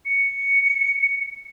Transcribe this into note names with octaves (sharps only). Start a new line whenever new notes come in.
C#7